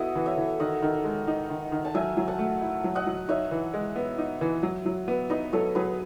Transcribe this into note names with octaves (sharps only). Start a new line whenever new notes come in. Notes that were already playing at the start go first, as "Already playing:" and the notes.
Already playing: B3 E4 F#4 A4 B4 D#5
E3
C#5 E5
E3
D#3 D#5 F#5
D#3
G#3
D#4
D#3
D#3
A5
F#3 E5 G#5
F#3
F#5 A5
A3
E4
F#3
D#5 F#5
F#3
D#4 C#5 E5
E3
G#3
B3
D#4
E3
F#3
F#3
B3
D#4 B4 D#5
F#3 A4 C#5
F#3 G#4 B4